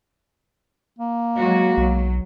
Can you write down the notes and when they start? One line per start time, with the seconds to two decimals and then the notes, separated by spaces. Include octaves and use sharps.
0.99 A#3
1.39 F#3 G#3 F#4
1.77 B1 F#3